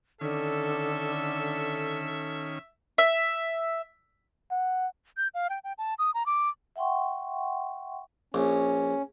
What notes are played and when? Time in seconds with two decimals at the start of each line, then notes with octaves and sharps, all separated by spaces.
0.21 D3 D#3 C#4 A4 E5
2.98 E5
4.51 F#5
5.17 G6
5.34 F5
5.50 G5
5.64 G5
5.78 A5
5.99 D#6
6.14 A#5
6.26 D6
6.76 E5 F#5 G5 C6 C#6
8.34 A#1 C#4